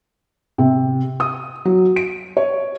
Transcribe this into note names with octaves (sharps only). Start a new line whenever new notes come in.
C3
D#6
F#3
D7
C#5